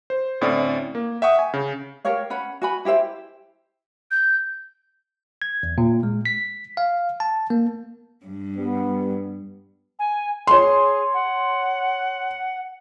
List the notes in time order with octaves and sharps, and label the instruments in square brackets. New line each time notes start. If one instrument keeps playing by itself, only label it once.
[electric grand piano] C5
D2 A2 C4 C#4 C#5 D5
A#3
E5 F#5 G5 C#6 D#6
G#5
C#3
[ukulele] G4 A#4 C#5 F5
C#4 F#5 B5
F#4 G#5 B5
E4 G4 C5 E5
[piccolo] G6
[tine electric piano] G#6
E2
A#2
G#3
B6
F5
A5
A#3
[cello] G2
[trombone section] G3 B3
[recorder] G#5
[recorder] G#4 [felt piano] C#5 C6
[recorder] F#5